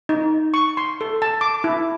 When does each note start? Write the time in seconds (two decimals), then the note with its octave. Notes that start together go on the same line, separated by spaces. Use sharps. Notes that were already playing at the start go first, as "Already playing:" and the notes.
0.09 D#4
0.54 C#6
0.77 C6
1.01 A4
1.22 A5
1.41 D6
1.64 E4